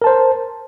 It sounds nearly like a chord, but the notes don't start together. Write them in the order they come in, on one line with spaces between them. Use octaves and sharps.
A#4 A5 C5